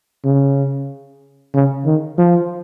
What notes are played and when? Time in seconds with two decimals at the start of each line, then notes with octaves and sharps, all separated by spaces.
0.25 C#3
1.54 C#3
1.86 D#3
2.18 F3